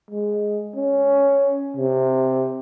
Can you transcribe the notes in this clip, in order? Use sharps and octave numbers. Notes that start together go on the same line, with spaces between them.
G#3
C#4
C3